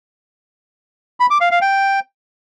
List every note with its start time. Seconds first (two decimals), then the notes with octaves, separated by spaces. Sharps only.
1.20 B5
1.30 D6
1.41 F5
1.51 F5
1.62 G5